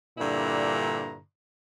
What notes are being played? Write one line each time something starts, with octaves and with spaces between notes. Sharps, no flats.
G2 A#2 D3 E4 A#5